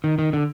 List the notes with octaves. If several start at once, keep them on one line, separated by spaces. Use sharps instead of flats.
D#3
D#3
D3